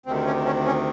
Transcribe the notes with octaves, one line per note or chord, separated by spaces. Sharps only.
D2 C3 D#3 C4
C#4
C#4
C#4